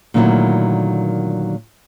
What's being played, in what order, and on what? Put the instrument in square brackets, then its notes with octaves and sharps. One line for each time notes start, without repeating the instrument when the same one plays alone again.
[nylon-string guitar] A#2 D3 D#3 F#3 A3 E4